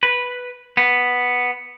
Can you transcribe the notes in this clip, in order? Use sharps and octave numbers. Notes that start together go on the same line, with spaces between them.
B4
B3